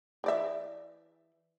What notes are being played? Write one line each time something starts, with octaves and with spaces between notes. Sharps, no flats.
E3 D5 E5